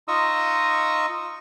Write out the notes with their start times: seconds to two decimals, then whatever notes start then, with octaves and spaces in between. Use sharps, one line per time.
0.08 D#4 F4 D#5 C#6 D#6 E6